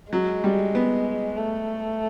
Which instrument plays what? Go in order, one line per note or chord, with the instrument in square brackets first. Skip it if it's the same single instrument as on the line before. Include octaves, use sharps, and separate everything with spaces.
[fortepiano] F#3 [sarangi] G#3
[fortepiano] G3
B3
[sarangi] A3